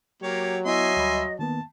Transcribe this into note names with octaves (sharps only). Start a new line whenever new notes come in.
F#3 A#3 G4 C#5
B3 E4 D#5 E5 G#5 C6
D2 G3 B5
D#3 A#3 B3 A5